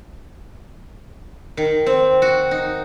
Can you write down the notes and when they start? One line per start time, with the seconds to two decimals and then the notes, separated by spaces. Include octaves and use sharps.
1.57 D#3
1.86 C4
2.22 F#4
2.51 D#4